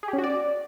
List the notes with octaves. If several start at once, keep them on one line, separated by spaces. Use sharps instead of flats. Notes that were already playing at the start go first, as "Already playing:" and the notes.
G#4
G4
C#4
F#4
D5